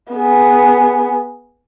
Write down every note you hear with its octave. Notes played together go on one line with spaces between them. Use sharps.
B3 G#4